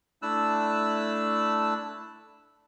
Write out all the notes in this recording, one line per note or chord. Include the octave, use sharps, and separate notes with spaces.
A3 D4 E4 A5 E6 F#6